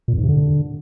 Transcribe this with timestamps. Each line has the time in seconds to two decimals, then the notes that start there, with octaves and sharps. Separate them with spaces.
0.08 A#2
0.13 F2
0.18 G#2
0.23 C3
0.29 D3